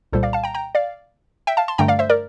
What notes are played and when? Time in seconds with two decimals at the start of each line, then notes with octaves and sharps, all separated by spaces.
0.12 C2 A#2 G3 A4 C5
0.23 D5 F5
0.33 F5 A5
0.44 G5 A#5
0.55 G5 A#5
0.75 D5 F5
1.47 E5 G5
1.57 F5 A5
1.68 A5 C6
1.78 G2 D3 A3 G5 A#5
1.88 D5 F5
1.99 C5 E5
2.10 A#4 D5